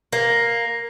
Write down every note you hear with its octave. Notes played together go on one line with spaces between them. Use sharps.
A#3